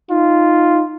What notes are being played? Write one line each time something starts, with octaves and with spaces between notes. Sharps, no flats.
D#4 F4